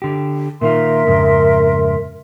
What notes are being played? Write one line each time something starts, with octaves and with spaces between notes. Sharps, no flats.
D3 G4
A#2 D#3 F4 A#4 E5 C6
F2 G#2 C#3